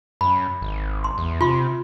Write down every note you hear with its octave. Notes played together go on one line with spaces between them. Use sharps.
F#2 B5
G#1
C6
E2
C3 F4 C6